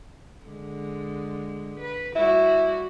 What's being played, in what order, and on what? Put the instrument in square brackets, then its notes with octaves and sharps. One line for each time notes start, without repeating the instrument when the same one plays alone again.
[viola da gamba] D3 G#3
B4
[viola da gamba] G3 F#4 [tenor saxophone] E4